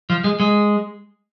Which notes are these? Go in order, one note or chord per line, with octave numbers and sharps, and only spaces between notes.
F3
G#3
G#3